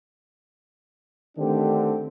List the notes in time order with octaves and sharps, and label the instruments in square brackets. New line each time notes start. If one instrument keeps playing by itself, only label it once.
[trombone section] D3 D#3 A3 C4 D4 G4